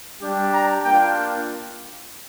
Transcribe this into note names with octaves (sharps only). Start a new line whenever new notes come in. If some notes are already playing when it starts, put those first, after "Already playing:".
G3 D4 G4
A#5
A#3 D4 F4 G5